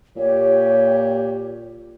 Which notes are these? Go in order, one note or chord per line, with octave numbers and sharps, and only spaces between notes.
A#2 G4 C#5